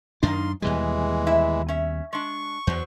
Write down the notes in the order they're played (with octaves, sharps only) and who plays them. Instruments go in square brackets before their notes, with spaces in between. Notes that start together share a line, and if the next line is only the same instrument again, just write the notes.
[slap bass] F#2 D4 [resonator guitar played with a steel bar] D#3 A#3 D#4 [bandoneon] C6
[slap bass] D#2 B2 G3 [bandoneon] E3 G#3 [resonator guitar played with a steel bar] G#4
[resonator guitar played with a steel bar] E4 E5
C#4 E5
[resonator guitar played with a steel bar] G#3 D4 [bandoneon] C#6
[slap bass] E2 [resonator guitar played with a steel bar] F#3 C5